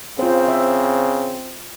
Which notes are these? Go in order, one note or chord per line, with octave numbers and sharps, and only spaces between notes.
C#3 C4 F4 C5
E5